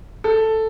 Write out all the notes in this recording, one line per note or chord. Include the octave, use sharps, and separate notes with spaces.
A4